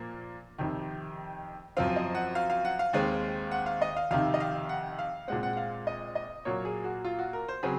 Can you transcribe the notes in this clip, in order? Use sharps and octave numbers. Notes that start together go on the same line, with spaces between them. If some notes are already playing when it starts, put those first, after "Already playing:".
Already playing: A#2 F3 A#3
F2 C3 D#3
F#2 F3 C4 F5
D#5
F#5
F5
F5
F#5
F5
D#2 D#3 G#3 C4
F#5
F5
D#5
F5
F2 C3 D#3 F5
D#5
F5
F#5
F5
A#2 G#3 C4 F#5
F#5
F#5
F5
D#5
D#5
A#2 F#3 A#3 C#5
G#4
F#4
F4
F#4
A#4
C5
C#3 F#3 C4 G#4